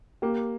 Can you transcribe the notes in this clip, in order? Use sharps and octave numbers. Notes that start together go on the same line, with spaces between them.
A#3 G4